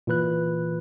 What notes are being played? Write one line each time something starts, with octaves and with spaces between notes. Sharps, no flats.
A#2 E3 B4 F#6